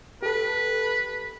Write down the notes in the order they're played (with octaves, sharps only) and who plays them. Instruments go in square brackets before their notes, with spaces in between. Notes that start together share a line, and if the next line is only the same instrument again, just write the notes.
[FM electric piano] G4 A4 [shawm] B4